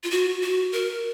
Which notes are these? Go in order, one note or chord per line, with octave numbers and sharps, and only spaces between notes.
F4
F#4
F#4
A#4